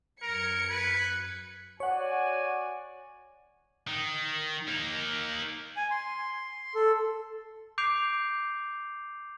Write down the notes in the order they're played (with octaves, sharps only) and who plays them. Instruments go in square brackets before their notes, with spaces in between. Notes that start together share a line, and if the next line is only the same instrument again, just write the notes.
[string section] F#2 G#6 C#7 [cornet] A#4
[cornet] B4
[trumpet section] F#4 D5 G#5 [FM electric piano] C#5 F#5
[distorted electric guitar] D#3
A#3 D#4
[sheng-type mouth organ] G#5
C6
A4
[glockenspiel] D6 G6 C7 D7 F7